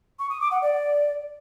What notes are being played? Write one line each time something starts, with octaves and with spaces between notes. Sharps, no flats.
C#6
D#6
D6
F#5
D5